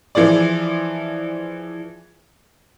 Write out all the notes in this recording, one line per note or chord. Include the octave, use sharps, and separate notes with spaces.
E3 F3 G#4 D5